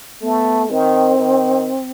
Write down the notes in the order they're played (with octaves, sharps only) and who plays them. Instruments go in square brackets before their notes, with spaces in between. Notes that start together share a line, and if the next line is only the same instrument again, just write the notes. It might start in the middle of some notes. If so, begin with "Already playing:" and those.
[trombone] A3 [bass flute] B3
[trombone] D#3 [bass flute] C4
[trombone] D#3